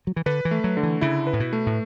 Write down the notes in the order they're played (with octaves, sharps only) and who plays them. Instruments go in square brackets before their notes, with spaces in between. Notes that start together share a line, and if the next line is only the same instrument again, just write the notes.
[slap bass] F#3
E3
[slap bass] D3 [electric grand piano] B4
[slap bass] E3
[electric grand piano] A3
[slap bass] F#3
[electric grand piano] D3
[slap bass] E3
[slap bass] C#3 [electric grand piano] E4
[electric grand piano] B4
[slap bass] A2
B2
[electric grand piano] A3
[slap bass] A2